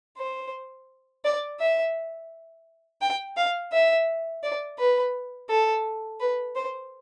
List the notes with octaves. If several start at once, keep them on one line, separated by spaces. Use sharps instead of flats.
C5
D5
E5
G5
F5
E5
D5
B4
A4
B4
C5